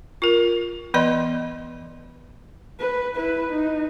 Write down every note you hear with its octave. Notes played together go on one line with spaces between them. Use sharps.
F4 A#4
E3 B3 D5 D#5 C6
B4
E4 B4
D#4